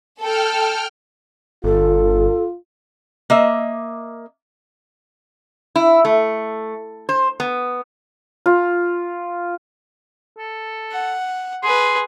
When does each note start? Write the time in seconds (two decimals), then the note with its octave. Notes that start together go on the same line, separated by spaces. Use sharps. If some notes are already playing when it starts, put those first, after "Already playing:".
0.21 A4 G5 F6
1.64 G1 F4 A4
3.30 A#3 D#5 E5
5.76 E4
6.05 A3
7.09 C5
7.40 B3
8.46 F4
10.38 A4
10.92 F#5
11.63 G#4 B4 C6